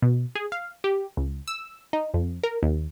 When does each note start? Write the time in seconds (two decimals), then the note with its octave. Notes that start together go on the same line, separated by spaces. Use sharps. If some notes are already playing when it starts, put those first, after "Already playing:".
0.02 B2
0.35 G#4
0.52 F5
0.84 G4
1.17 C#2
1.48 E6
1.93 D#4
2.14 F2
2.43 A#4
2.63 D#2